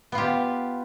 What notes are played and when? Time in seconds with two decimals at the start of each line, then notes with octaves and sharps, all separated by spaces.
0.12 B3
0.15 F4
0.18 G4